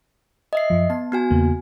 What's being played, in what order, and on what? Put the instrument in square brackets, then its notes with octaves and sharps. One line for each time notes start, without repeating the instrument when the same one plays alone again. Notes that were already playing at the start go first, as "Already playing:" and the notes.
[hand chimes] D#5 E5 C7
[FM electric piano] F#2 F3
[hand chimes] B3 [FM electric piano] A5
[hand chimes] B3 F#4 G#5
[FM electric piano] E2 C#3 A#3